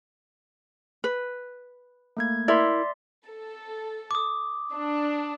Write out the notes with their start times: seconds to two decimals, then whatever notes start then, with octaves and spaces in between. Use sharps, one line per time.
1.04 B4
2.17 A3 A#3 G#6
2.48 E4 A#4 D5 E5 C6
3.27 A4
4.11 D6 D#6
4.73 D4